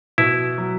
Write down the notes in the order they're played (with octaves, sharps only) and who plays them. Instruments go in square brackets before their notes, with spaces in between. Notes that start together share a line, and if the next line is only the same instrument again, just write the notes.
[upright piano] B2 [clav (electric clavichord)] E4
[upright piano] F#3